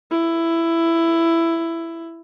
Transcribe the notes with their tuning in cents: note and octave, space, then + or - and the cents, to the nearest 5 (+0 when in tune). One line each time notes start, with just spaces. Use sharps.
E4 +10